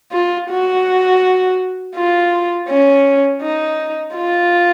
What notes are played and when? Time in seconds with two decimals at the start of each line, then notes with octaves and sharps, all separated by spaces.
0.12 F4
0.50 F#4
1.95 F4
2.69 C#4
3.43 D#4
4.16 F4